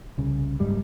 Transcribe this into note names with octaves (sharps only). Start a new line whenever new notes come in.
C2 C#3
F#1 D#2 G#2 G3